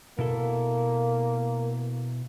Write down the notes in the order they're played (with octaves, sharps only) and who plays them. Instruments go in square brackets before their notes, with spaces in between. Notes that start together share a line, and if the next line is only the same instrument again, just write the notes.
[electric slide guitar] B2 E4 A4 [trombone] A#3